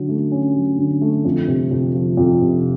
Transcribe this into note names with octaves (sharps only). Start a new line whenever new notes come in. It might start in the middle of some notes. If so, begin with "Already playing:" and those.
Already playing: D3 F#3 C#4
A3
C#4
F#3
D3
A3
F2
C3
F2
F3
F2
C3